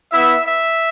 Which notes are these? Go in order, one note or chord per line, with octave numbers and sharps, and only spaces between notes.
B3 E4 E5
E5